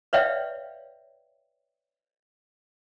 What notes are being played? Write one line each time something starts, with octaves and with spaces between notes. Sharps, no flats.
B4 C#5 D5 E5 F5 G5